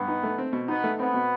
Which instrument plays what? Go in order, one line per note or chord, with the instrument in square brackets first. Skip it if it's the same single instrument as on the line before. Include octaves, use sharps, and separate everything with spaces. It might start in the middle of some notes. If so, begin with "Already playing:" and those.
Already playing: [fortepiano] G2 [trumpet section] B3
[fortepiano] D#4
A3
C4
B2
[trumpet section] B3 [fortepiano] D#4
[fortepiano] A3
[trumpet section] B3 [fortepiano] C4
[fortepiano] B2